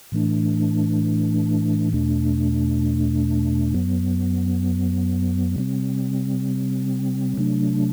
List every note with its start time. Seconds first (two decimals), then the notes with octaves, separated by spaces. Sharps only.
0.12 A2 E3 A3 D4
1.93 E2 B2 A3 D4
3.75 F#2 F#3 B3
5.56 C3 G3 C4
7.38 C3 F#3 A3 D4